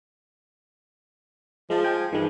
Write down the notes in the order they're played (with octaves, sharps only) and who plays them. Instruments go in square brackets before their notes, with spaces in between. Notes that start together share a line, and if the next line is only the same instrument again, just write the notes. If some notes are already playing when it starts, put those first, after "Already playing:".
[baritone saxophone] F3 [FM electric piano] G#3 A5
[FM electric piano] G5 G#5
[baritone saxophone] G2 [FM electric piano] D#3 E3 G#3